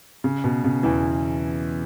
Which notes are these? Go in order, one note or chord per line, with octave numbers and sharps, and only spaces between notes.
C#3
B2
C#3
E2 E3